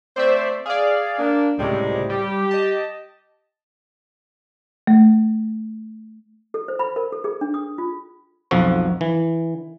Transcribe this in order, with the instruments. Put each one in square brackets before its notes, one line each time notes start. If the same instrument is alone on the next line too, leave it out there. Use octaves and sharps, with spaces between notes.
[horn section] A3 C4 D5 [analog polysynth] C5 E5
[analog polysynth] G#4 D5 [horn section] F5
[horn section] A#3 D4
[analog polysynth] C#2 A2 C3 [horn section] G3 G#3
[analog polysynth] G3 [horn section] G4
[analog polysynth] D#5 A5
[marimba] A3
[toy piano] A4
C5
B5
A#4
A4
G#4
D4
D#6
F4
[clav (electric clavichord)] B1 F2 F3 F#4
E3